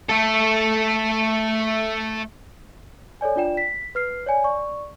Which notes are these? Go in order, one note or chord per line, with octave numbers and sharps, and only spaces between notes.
A3 A4
A4 C#5 D5 G#5
D4 F4 D5 G5 E7
B6
B4 F6 C7
C#5 D5 G#5
D5 C#6